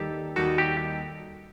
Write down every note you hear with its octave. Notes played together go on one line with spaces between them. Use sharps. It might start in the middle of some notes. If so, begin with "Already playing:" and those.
Already playing: D#2 D#3 G3 D#4 G4 A4
D#2 D#3 G3 D#4 F#4 A4
G4